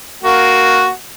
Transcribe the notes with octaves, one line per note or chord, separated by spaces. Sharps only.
A#3 F#4